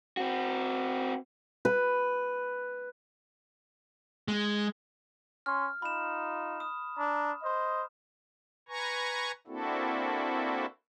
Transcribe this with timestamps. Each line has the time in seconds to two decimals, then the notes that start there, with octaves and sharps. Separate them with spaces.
0.17 C4 F#4
1.65 B4
4.28 G#3
5.46 C#4 C6 F6
5.82 D#4 F4 B5 E7
6.60 D#6
6.96 D4 A#5
7.42 C5 D#5
8.69 B4 G#5 A#5 C#6
9.47 A#3 C4 D4 E4 F#4 A4